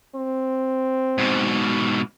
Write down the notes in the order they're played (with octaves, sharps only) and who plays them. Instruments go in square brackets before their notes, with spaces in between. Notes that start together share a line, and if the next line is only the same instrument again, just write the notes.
[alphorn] C4
[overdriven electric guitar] G#2 B2